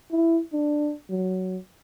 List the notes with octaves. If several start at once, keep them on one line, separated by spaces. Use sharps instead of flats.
E4
D4
F#3